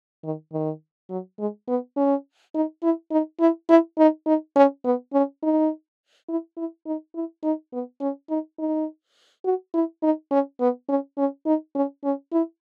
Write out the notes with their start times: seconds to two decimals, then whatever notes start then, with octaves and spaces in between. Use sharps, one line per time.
0.24 D#3
0.53 D#3
1.10 F#3
1.39 G#3
1.68 B3
1.97 C#4
2.55 D#4
2.83 E4
3.11 D#4
3.40 E4
3.69 E4
3.98 D#4
4.26 D#4
4.56 C#4
4.85 B3
5.13 C#4
5.43 D#4
6.28 E4
6.57 E4
6.86 D#4
7.15 E4
7.43 D#4
7.73 B3
8.01 C#4
8.30 D#4
8.59 D#4
9.45 F#4
9.74 E4
10.03 D#4
10.31 C#4
10.60 B3
10.89 C#4
11.18 C#4
11.46 D#4
11.75 C#4
12.04 C#4
12.32 E4